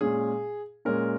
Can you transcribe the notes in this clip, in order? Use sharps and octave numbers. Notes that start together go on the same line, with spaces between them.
A#2 G#3 C#4 G#4
A#2 G#3 C#4 A#4